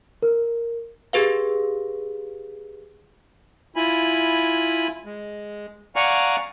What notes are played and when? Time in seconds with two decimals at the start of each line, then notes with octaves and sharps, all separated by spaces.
0.22 A#4
1.13 G4 G#4 B4 F5
3.76 E4 F4 G#5 B5
5.05 G#3
5.96 D5 F5 F#5 G#5 A#5 C#6